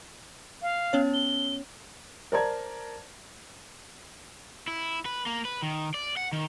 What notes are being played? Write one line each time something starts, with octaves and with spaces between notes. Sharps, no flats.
F5
B3 C#4 C#5
G7
A#4 C5 D5 A5 A#5 G#6
E4
B4
A#3
B4
D#3
D5
F#5
D#3